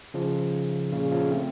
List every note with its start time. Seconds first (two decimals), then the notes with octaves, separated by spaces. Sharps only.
0.14 C#3 F3
0.93 A#2 C#3
1.11 C#3 F3
1.31 A3 C4